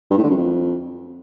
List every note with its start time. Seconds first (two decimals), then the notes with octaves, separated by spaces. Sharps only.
0.11 G2
0.17 A2
0.24 D3
0.30 F#2
0.37 F2